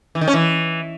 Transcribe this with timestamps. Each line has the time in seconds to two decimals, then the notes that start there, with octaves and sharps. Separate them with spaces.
0.15 E3
0.21 D#3
0.28 C#4
0.34 E3